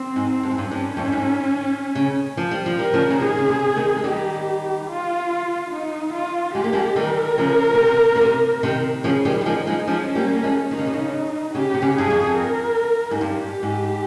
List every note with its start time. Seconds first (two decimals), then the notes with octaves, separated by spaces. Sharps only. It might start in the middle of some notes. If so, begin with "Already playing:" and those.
Already playing: C4
0.16 G#2
0.30 C4
0.43 G2
0.51 G#2
0.58 G2
0.71 G2 C#4
0.97 F2
1.05 G2
1.12 G#2
1.95 C#3
2.37 F3
2.51 G3
2.66 F3
2.79 G3 A#4
2.93 C#3 F3
3.10 C#3
3.20 C3 D#3 G#4
3.38 C#3
3.49 C3
3.76 C3 D#3
3.96 G#3
4.04 D#3 G3 G4
4.88 F4
5.71 D#4
6.13 F4
6.55 G#3 G4
6.64 A#3
6.73 F3 G#3
6.96 D#3 G3 A#4
7.38 C#3 F3
7.74 C#3
7.79 C3
8.15 C#3
8.21 C3
8.63 C3 D#3
9.04 C#3 F3 G#4
9.25 D#3 G3
9.41 G3
9.46 F3 G#3 D#4
9.67 F3 G#3
9.87 F3 G#3 C#4
10.15 G3 A#3
10.33 A#3
10.43 F3 G#3
10.71 D#3 D#4
10.79 C#3
10.87 C3
10.94 C#3
11.54 C#3 G4
11.74 C3
11.82 C#3
11.97 G2 G#4
12.10 F2
12.37 A#4
13.11 G#2
13.21 G2 G4
13.63 G#2